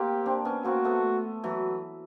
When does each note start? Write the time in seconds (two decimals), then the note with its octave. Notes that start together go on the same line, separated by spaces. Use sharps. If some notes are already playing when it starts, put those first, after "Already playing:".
Already playing: A#3 C4 G4
0.26 C4 D4
0.45 B3 C#4
0.65 A#3 C4 F#4
0.84 A3 B3
1.44 E3 F#3